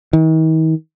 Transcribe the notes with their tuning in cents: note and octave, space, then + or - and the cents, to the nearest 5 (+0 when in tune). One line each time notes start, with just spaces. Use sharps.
D#3 +45